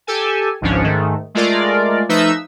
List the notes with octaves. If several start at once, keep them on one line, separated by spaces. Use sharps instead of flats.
G4 A4 G#5
G#1 C#2 G#2 F3 C#4 D4
G#2 D#3 A3
G#3 A3 F4 A#4 D5
F3 A3 D#4 B4 E5 E6